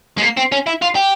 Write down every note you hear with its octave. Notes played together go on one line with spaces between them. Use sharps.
G#3
A#3
C4
C#4
E4
F4
G4